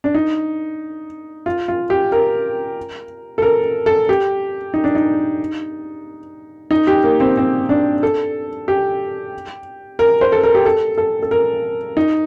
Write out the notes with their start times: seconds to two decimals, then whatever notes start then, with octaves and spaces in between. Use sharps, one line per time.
0.04 D4
0.15 D#4
1.46 F4
1.68 F4
1.90 G4
2.12 A#4
3.38 A4
3.42 A#4
3.86 A4
4.09 G4
4.74 D#4
4.84 D4
4.95 D#4
6.71 D#4
6.87 G4
7.03 A#3
7.20 C4
7.37 C4
7.69 D4
8.03 A4
8.68 G4
9.99 A#4
10.21 C5
10.32 A4
10.43 A#4
10.55 G4
10.66 A4
10.98 A4
11.22 A4
11.31 A#4
11.97 D#4